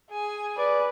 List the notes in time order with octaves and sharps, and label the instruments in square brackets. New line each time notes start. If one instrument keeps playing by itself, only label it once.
[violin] G#4 G#5
[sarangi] B4 [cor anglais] D5